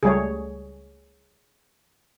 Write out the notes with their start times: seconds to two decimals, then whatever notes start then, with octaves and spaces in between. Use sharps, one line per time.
0.03 C#2 G3 A3 G#4 C#5